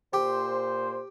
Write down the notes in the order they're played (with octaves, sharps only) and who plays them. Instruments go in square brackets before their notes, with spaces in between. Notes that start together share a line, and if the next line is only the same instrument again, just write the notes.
[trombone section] A#2 C5 [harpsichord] G4